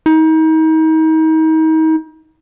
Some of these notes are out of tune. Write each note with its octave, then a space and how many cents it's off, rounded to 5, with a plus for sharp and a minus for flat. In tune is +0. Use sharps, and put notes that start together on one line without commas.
D#4 +35